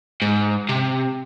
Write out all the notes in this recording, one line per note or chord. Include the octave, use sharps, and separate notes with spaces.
G#2
C3